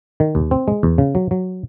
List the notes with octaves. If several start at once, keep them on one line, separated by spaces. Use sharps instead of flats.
D#3
D#2
C4
G#3
E2
C#3
F#3
F#3